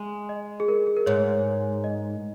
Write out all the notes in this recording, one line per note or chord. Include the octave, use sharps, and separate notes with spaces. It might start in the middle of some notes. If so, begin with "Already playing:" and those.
Already playing: G#3
D#5
G#4
A#4
G#4
A#4
G#2 C#5
D#5